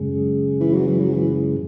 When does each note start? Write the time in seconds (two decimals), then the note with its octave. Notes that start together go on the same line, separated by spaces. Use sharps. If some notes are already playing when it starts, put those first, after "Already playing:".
Already playing: F#2 C#3 G#3
0.60 E3
0.74 F#3
0.88 E3
1.00 F#3
1.14 E3